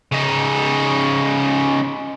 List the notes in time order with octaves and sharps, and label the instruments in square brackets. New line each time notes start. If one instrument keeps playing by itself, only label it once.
[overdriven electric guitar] C#3 D#4